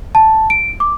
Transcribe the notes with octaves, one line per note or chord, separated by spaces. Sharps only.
A5
D7
D6